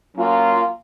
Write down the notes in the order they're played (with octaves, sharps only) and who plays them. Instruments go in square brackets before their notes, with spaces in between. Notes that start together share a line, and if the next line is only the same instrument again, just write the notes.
[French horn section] F#3 A#3 C#4 F4